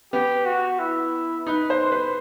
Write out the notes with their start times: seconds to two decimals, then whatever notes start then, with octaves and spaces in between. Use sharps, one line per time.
0.13 B3 G4
0.46 F#4
0.80 E4
1.47 D#4 B4
1.70 C5
1.81 C5
1.92 B4